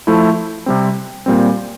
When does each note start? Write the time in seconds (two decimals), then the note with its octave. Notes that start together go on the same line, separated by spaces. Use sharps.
0.07 F3 A3 E4
0.66 C3 G3 C4
1.26 A#2 G3 C4